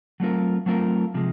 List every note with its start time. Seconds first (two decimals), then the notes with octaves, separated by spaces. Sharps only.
0.20 F#3 A3 C4 F4 A#4
0.66 F#3 A3 C4 F4 A#4
1.14 C3 F3 G#3